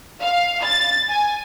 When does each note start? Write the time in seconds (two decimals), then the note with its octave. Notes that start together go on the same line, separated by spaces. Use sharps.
0.21 F5
0.62 A6
1.09 G#5